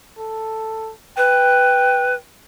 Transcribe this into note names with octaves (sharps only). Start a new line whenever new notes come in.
A4
B4 G5